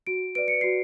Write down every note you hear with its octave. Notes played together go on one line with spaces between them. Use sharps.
F#4 D7
B4 D5 D7
C#7
F#4 C7